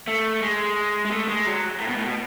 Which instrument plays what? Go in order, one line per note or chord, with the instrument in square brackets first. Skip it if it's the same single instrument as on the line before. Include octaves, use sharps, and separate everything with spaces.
[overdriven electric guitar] A3
G#3
G#3
A3
G#3
F#3
A2
B2
A2
B2